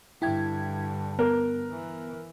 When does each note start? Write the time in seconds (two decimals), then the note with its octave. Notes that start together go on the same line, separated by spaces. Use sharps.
0.22 G2 D3 E4 G5 G#6
1.19 B3 A#4
1.71 E3